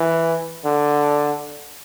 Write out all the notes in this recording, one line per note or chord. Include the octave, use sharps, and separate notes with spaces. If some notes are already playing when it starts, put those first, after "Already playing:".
Already playing: E3
D3